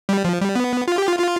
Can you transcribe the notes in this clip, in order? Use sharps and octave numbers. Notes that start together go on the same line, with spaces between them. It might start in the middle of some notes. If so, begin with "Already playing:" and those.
G3
F3
G3
B3
F4
G4
F4
F4